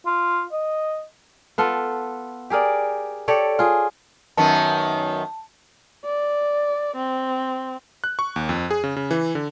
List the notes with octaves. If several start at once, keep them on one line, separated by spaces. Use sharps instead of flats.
F4
D#5
B3 F4 A4
G4 G#4 A#4 D5
G4 A4 C#5 D5
F4 G#4
F#2 D#3 B3 A5
D5
C4
F#6
C#6
D#2
F2
G#4
C#3
C#3
E3
D3